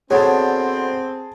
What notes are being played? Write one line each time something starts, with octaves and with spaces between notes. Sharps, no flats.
B2 D3 C4 G#4 C#5 D5 A5